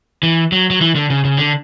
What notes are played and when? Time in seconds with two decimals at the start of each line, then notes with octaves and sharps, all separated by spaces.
0.23 E3
0.52 F#3
0.70 F#3
0.81 E3
0.96 D3
1.10 C#3
1.25 C#3
1.38 D3